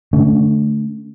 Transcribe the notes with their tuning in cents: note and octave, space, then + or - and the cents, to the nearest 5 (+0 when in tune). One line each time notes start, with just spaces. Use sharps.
D3 +0 A3 -10 C#4 +30